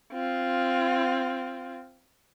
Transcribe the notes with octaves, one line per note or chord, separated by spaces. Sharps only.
C4 F4